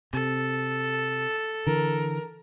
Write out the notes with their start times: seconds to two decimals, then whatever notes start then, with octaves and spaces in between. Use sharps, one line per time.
0.13 C3 A4
1.67 D3 E3 A#4